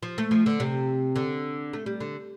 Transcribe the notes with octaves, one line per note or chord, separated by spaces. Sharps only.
F3
A3
F3
D3
C3
D3
A3
G3
D3